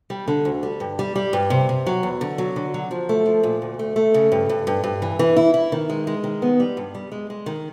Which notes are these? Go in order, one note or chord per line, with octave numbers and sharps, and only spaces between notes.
G3
D3
D2
G3
G2
G3
G3
G2
C3
C3
F#3
E2
D3
F#3
D3
F#3
F3
A3
F3
A#2
D2
A3
A3
C#3
G2
G2
G2
G2
E3
E3
E4
E4
D#3
G#3
G#3
D#3
B3
G3
G2
G3
G#3
G#3
D#3